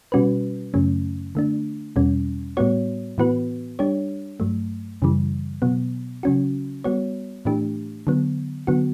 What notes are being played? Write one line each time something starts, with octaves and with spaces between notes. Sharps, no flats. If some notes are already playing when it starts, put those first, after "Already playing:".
B2 G3 C#4 F#4 B4
F#2 C#3 F#3 A3 C#4
D3 A3 D4
E2 B2 G3 C#4
A2 G3 B3 F#4 C#5
A2 E3 B3 F#4 B4
G3 D4 G4 C#5
G2 F#3 A3
F#2 C#3 E3 G3
B2 F#3 B3
C#3 F#3 C#4 F#4
G3 B3 F#4 C#5
A2 E3 A3 D4 G4
D3 F#3 B3
D3 F#3 B3 F#4